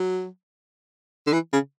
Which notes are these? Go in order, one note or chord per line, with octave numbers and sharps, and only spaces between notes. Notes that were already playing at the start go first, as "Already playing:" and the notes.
Already playing: F#3
D3
E3
C#3